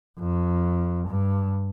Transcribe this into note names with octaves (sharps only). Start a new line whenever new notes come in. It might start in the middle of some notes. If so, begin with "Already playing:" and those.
F2
G2